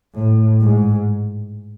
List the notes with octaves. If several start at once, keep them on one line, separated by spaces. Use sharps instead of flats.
A2
G#2